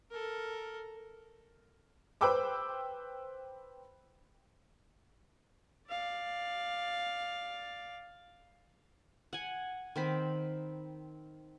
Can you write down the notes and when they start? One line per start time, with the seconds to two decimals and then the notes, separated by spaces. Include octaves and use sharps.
0.11 A4 A#4
2.21 B4 C5 G5 B5 D6 E6
5.89 D5 F5
9.33 F#5 G#5
9.96 D#3 C4 B5